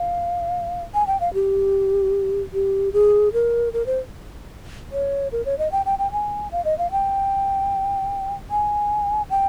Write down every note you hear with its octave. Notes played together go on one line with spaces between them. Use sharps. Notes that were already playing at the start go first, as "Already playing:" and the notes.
Already playing: F5
G#5
G5
F5
G4
G4
G#4
A#4
A#4
C5
C#5
A#4
C#5
D#5
G5
G5
G5
G#5
F5
D#5
F5
G5
G#5
G5